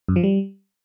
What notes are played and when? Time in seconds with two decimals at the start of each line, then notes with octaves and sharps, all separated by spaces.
0.08 F#2
0.16 F3
0.23 G3